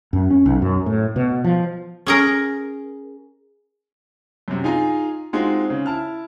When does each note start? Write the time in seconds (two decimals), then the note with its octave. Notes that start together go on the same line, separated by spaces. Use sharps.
0.13 F#2
0.31 C#4
0.46 B1
0.62 F#2
0.86 A2
1.16 B2
1.44 F3
2.07 C#4 G#4 A#4
4.48 F#2 C3
4.64 D#4 F4 G#4 G#5 A#5
5.33 G#3 C4 D#4 F4 F#4 G#4
5.70 C#3
5.86 E4 A5 F6